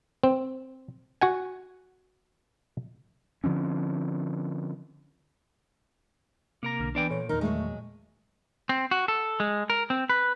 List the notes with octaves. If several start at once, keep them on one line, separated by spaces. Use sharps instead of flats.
C4
F#4 F#5 G#5
D3 F3 C4 C#4
C3 A#3 A#4 A#5
B1 D3 F6
E3 B3 D4 D5 G5
A#2 A4 C#5
E2 D#3 D#4 A#4
F#3 G#3 A3
C4
F#4
A4
G#3
A#4
C4
B4